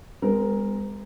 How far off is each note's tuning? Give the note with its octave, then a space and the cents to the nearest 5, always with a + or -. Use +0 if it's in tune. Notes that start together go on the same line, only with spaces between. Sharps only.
G#3 -35 B3 +45 A#4 +0